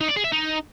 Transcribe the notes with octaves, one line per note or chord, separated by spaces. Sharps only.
D#4
D5
G#4
E5
D#4